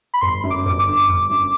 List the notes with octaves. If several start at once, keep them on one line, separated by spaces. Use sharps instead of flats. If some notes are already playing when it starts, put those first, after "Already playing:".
B5
G1 C6
F#2
D6
G1
D6
D3
G1
F#2